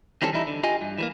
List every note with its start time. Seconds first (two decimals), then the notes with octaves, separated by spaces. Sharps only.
0.22 D#3 E3 G3 C4 C#4 A4
0.33 E3 G3 D#4 E4
0.47 D3
0.63 F4 G4 D#5 G#5
0.81 G2
0.98 E3 G3 A#3